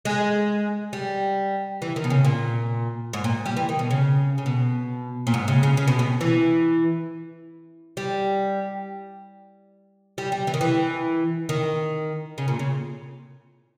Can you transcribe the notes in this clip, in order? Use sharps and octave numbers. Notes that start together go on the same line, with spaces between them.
G#3
G3
E3
D#3
B2
C#3
A#2
G#2
A#2
G3
E3
D#3
B2
C#3
C#3
B2
A#2
G#2
C#3
C#3
C#3
B2
B2
E3
G3
G3
G3
E3
D#3
E3
D#3
C#3
A#2
C#3